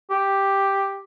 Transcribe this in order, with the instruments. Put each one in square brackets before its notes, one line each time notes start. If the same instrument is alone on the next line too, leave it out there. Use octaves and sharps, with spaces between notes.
[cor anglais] G4